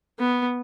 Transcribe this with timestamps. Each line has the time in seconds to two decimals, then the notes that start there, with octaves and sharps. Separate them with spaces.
0.19 B3